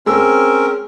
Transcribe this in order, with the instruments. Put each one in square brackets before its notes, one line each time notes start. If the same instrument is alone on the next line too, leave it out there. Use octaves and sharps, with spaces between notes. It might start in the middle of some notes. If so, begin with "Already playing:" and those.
[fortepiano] G#3 E6 [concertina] C4 C#4 A#4